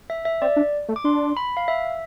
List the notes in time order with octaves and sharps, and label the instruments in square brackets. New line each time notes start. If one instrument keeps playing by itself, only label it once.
[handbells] E5
E5
[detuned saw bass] C4 [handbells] D5
[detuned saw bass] D4
A3
[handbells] D6
[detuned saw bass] D4 [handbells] C6
[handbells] B5
F5
E5